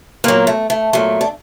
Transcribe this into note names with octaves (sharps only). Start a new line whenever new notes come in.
A#2 F#3 A#3
A3
A3
A#2 F#3 A3
D4